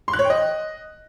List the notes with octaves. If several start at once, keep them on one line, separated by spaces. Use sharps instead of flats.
C6
F#6
C#5
G5
D#5